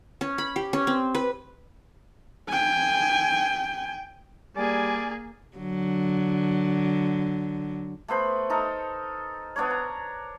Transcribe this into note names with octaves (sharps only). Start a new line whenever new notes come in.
C#4
B5
G4
C#4
C4
B4
G5 G#5
G3 A#3 G#4 D5 G#5
D3 F#3
A3 B3 C5 B5
D#4 A4 A#4
B3 D4 A#4 C#5
A#5